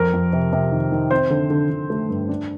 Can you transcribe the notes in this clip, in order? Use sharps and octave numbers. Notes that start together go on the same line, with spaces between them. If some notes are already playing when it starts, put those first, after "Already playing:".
Already playing: F2 A#4
F2
C3
C3
D#3
D#3
C4 C5
D3
D3
D3
A3
G2
D4